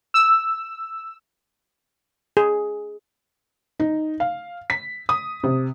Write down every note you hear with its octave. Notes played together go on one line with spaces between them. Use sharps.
E6
G#4
D#4
F5
B6
D#6
C3